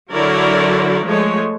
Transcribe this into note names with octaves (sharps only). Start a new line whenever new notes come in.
D3 F#3 E4 A#4 C#5 D5
F3 G#3 A3 C#5